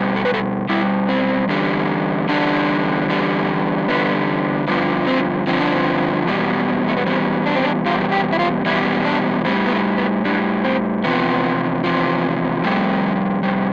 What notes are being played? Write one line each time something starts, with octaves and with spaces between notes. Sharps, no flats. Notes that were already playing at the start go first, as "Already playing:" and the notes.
Already playing: B2 G3
A4
B4
A4
B2 G3 E4
C4
E2 D3 G3
E2 D3 G3 D4
E2 D3 G3
E2 D3 G3 B3
G2 D3 F3 B3
C4
G2 D3 F3 C4
D4
C4
E2 B2 G3
A3
B3
E2 B2 G3 C4
D4
C4
D4
E2 B2 G3 F4
G4
E4
F4
E2 B2 G3 E4
D4
A2 G3 C4
B3
A3
B3
A2 G3 D4
C4
E2 C3 F3 B3
E2 C3 F3
F2 C3 G3 A3
F2 C3 G3